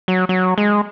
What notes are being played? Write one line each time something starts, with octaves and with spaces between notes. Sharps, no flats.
F#3
F#3
G#3